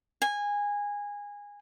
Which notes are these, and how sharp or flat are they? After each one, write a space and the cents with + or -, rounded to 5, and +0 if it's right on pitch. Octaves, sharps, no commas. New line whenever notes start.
G#5 -20